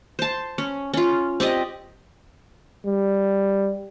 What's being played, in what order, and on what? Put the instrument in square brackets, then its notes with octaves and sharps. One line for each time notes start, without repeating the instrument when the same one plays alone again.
[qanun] C5 A5
C#4
C#4 F4
C4 G4 D5 D#5
[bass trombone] G3